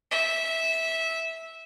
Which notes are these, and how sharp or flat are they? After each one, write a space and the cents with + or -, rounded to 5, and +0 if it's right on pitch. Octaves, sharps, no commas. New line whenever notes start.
E5 -15